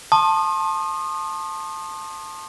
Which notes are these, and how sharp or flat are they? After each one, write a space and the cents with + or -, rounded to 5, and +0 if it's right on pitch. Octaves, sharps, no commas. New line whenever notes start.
A5 +5 C6 +35 D#6 -30